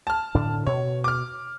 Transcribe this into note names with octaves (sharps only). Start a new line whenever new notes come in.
A5 F6
A2 D3 D4
B2 C#5
D6 F6